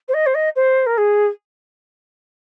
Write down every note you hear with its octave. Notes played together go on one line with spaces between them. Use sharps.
C5
D#5
C5
D#5
C5
A#4
G#4